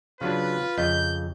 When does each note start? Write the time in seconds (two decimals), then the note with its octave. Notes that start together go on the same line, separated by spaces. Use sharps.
0.21 C#3 F#3 D4 F4 B4
0.78 F2 C#3 D#5 G6